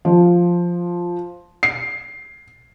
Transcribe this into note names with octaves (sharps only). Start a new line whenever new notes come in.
F3
C7